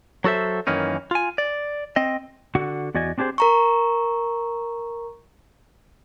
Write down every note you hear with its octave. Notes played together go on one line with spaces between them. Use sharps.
F#3 F#4 A4 C5 E5
F#2 D#3 E3 A#3 C#4 D#4
F4 G#5
D5
C4 D#5
D3 F#4 F#5
E2 F#4 D5 D#5 G#5
C4 D4 G4 G#4 C5
A#4 A#5 C#6